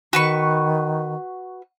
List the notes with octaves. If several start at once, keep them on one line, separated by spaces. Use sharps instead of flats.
D#3 F#4 B4 C#6